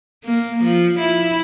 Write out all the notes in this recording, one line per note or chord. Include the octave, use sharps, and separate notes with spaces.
A#3
F3
E4